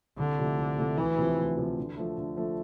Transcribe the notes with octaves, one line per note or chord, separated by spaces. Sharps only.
C2 D3
C3 F3 A3
C2
C3 F3 A3
D2 E3
C3 F3
D2
C3 F3
D3
F3 A3
D3
F3 A3